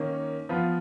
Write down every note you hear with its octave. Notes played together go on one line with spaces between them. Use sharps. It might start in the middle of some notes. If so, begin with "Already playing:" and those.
Already playing: D#3 A#3 C#4
F3 B3 F4